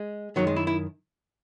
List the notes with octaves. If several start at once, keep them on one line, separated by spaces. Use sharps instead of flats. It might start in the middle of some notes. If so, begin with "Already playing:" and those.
Already playing: G#3
F#2 D#3 F#3
G#3
E4
E4